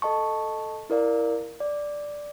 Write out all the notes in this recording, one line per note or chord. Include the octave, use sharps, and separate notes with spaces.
A4 D#5 A5 C#6
E4 A#4 D5 F5
D5